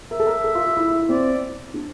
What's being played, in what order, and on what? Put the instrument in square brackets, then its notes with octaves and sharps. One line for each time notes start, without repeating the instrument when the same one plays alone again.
[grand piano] A#4 [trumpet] E5
[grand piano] A4
A#4
A4
F4
F4
E4
E4
E4
[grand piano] C4 [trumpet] D5
[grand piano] D4